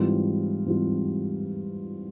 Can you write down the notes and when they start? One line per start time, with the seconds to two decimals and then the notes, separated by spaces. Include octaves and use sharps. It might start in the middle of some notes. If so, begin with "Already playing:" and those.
Already playing: G#2 E3 G3 C4 F4
0.66 G#2 E3 G3 C4 F4